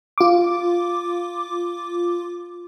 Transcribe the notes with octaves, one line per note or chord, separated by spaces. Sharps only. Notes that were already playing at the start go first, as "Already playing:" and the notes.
F4 D6